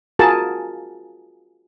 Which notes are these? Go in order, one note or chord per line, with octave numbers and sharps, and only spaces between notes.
F4 F#4 G#4 A#4 A5